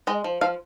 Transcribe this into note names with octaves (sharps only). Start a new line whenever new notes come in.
G#3 D#5
F3
F3 F5